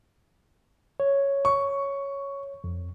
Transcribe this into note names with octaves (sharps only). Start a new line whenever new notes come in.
C#5
C#6
F2